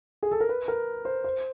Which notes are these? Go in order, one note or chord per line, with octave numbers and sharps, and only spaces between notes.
G#4
A4
A#4
B4
A#4
C5
C5